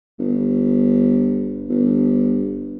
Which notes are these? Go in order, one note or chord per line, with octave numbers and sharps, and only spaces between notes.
G1
G1